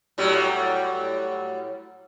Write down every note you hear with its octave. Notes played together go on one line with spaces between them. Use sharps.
A2 F#3 G3